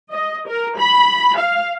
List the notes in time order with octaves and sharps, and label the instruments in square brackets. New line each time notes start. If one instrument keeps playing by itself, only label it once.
[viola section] D#5
A#4
B5
F5